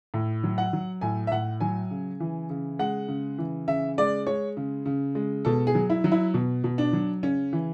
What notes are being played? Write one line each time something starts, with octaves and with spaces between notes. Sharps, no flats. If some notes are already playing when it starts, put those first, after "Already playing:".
A2
F#3
F#5
F#3
A2 G#5
E5
A2 F#5
F#3 G#5
C#3
E3
C#3
G#3 F#5
C#3
E3
C#3 E5
G#3 D5
G#3 C#5
C#3
C#3
G#3
B2 A4
G#4
F#3
E4
F#3
E4
B2
B2
D4
F#3
C#3 C#4
E3